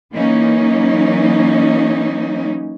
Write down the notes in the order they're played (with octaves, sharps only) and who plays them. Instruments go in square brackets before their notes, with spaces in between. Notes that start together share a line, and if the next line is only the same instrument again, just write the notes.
[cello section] E3 F#3 A#3 C#4 D#4